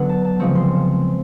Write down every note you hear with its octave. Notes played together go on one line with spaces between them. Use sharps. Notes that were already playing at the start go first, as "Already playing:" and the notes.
Already playing: D3 F#3 B3 D4 F#5
A5
A5
C#3 F3 G#3 C4 C#6
C6